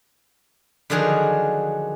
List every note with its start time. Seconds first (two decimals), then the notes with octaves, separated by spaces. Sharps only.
0.90 D3 D#3 F3 F#3 D4 G#4